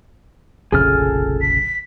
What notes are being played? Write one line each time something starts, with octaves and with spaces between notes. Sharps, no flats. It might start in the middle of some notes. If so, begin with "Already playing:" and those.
F1 A#1 C#3 G#4 A4 F6
B6